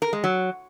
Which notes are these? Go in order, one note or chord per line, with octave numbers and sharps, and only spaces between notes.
A#4
G#3
F#3